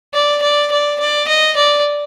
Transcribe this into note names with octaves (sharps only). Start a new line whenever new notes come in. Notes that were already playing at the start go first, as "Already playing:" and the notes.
D5
D5
D5
D5
D#5
D5